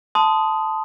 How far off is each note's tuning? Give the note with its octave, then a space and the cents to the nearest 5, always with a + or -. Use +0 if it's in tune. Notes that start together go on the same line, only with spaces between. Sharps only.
A5 -5 C6 -25 D#6 +0